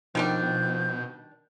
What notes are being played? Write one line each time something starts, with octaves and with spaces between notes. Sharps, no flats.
B2 D#3 F3 G3 D4 G6